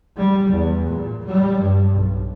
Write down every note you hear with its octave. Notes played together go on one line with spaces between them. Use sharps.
G3
E2
A#2
G3
G2
B1